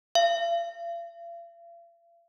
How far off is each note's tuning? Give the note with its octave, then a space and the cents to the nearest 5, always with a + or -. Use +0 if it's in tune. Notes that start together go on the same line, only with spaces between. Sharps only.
F5 -45